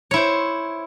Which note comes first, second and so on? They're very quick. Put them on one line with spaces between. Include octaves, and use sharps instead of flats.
C#5 E4 C5